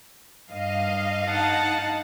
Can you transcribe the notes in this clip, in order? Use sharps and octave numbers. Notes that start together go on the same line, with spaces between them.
G2 D#5 F5
D#4 F#5 A5